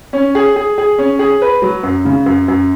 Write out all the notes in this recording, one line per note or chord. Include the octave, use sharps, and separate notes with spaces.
C#4
G#4
G#4
G#4
C#4
G#4
B4
F#3
F#2
C#3
F#2
F#2